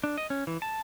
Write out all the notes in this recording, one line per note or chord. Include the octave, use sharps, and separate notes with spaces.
D4
D#5
C#4
E3
A5